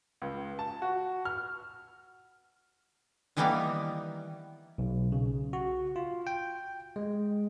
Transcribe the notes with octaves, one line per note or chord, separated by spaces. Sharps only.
C#2
A5
F#4
F6
D#3 E3 G3 A#3 B3 D#4
B1
C#3
F#4
F4
G5
G#3